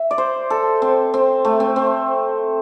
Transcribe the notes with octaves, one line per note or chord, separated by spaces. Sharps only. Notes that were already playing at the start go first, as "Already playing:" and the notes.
Already playing: E5
D5
C5
A4
C4
C4
A3
C4
C4